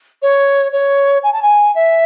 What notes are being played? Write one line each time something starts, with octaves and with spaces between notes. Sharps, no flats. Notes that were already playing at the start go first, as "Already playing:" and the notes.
C#5
C#5
G#5
A5
G#5
E5